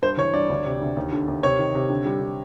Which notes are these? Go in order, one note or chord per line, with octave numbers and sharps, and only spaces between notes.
G2 C5
E3 C#5
G2 D5
D2
C3
D2
D#2
D3
D#2
C3 C#5
D#3
C3
D3
G3
D3